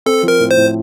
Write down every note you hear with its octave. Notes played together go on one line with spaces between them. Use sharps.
C4 A4
F3
A#4
A2
C5
A2